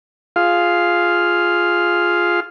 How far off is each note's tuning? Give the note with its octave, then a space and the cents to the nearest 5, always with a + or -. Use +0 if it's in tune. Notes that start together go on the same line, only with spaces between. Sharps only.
F4 +0 G#4 +0 F5 +0